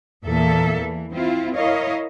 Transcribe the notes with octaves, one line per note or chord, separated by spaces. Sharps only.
E2 A#2 A#3 A4 E5
E3
C4 E4 F4
E4 A#4 C#5 D#5 F5